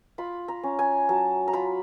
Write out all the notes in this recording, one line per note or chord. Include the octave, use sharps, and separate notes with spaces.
F4 B5
A#5
C#4
G#5
F#3 A5
A#5
F4 B5